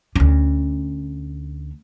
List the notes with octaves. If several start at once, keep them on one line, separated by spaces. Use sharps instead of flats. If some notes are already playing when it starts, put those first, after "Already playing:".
D2 C#4